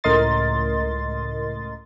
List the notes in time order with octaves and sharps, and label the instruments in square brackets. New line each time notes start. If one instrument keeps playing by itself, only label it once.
[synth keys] C#2 A2 A#4 D#5 C6 A6